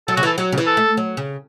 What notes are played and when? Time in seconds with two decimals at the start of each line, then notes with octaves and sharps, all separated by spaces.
0.08 F#3 A4
0.17 C#3 F#4
0.23 E3 A4
0.38 F#3
0.52 C#3
0.58 E3
0.67 A4
0.77 A3
0.97 F#3
1.17 C#3